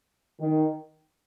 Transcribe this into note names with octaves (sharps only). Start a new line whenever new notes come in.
D#3